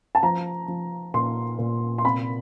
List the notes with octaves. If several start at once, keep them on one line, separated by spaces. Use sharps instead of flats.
A5
F3 A#5
F3
A#2 C6
A#2
C6
C3 B5